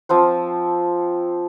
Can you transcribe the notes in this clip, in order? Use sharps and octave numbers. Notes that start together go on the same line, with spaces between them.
F3 C4 C5